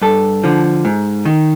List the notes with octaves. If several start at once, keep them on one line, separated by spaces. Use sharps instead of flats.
G2 A4
D3 F3
G#2
D#3